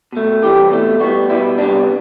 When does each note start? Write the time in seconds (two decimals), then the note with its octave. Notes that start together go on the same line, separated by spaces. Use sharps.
0.13 B2 A3
0.42 C3 E3 G3 G4
0.71 B2 A3
1.00 A2 G3 B3 F#4
1.29 B2 G3 B3 E4
1.58 C3 G3 B3 D4